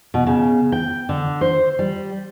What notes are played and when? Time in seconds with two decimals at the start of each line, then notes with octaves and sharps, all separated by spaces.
0.14 B2
0.27 C#3
0.72 G5
1.09 D3
1.41 C5
1.79 G3